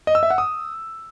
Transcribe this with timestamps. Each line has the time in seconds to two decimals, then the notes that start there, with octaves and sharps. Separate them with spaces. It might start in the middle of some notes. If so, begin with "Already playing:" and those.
0.07 D#5
0.15 E6
0.23 E5
0.30 F#5
0.38 D#6